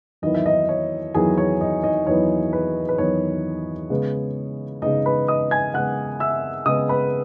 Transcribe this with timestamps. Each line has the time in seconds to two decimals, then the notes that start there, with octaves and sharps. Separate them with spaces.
0.22 E2 D#3 F#3 B3 E4 D#5
0.34 E5
0.46 D#4 D#5
0.69 C#5
1.14 E2 D#3 F#3 B3 E4 G#4 G#5
1.38 C#5
1.61 D#4 D#5
1.84 D#4 D#5
2.07 E2 D#3 F#3 B3 E4 C#5
2.53 B4
2.89 B4
2.98 E2 D#3 F#3 B3 E4 C#5
3.90 C#3 G#3 B3
4.82 C#3 G#3 B3 D#4 D#5
5.06 B4 B5
5.28 D#5 D#6
5.51 G#5 G#6
5.74 C#3 G#3 B3 F#5 F#6
6.20 E5 E6
6.66 C#3 G#3 B3 D#5 D#6
6.89 B4 B5